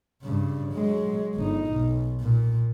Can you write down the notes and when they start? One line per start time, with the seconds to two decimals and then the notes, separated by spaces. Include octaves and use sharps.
0.22 G2 C#3
0.72 F#3 G#3
1.35 G1 D#4
1.73 B1
2.20 A#2